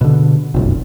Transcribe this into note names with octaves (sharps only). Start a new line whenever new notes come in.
B2 D3
F1 B1 F#2